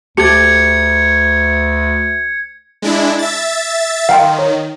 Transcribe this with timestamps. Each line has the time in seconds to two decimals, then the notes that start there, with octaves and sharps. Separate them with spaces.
0.17 D2 G4 A4 G#6 C#7
2.82 G#3 D4 E4
3.19 E5 A6
4.09 D#3 F5 G5 C6
4.39 C#5